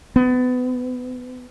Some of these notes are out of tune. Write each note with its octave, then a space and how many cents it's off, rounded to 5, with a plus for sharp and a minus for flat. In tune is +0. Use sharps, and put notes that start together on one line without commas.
B3 +30